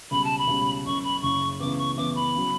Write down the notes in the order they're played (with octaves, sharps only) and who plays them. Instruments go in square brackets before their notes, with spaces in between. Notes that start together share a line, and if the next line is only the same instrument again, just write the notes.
[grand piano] C#2 B2 G3 C#4 [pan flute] B5
[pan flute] A5
B5
[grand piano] C#2 B2 G3 C#4
[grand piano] F#1 F#2 C#3 [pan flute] C#6
[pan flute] B5
[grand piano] F#1 F#2 C#3 [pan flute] C#6
[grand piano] C#2 C#3 E3 B3 [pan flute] D6
[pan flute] C#6
[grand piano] C#2 C#3 E3 B3 [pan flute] D6
[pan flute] B5
[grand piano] C#3 F#3